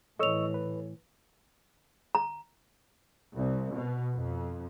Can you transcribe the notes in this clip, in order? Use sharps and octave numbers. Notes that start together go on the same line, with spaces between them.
A2 E3 A4 C#5 D#5 C#6 E6 F7
B4
A#5
C2
B2
F2